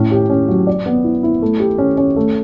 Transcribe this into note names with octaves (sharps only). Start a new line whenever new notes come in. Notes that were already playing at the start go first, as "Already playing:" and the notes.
Already playing: A2 C#4
G4
C#4
F#3
D5
B3
E4
E4
A3
G4
C#4
C#4
A3